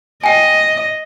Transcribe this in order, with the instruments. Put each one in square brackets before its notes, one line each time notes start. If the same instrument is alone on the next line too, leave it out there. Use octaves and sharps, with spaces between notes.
[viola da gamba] D#5 [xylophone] G5 G#5